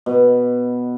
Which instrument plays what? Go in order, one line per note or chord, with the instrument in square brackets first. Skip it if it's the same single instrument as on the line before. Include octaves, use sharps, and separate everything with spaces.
[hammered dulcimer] B2